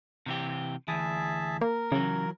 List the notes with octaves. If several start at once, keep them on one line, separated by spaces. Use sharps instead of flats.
C3 E3 G4
D2 E3 G#4 E5 A5
A#3 A#4
C#3 E3 F#3